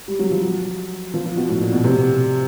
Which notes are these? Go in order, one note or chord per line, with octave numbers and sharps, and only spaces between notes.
G3
F#3
F3
F#3
F3
F3
B2
A2
A#2
B2
C3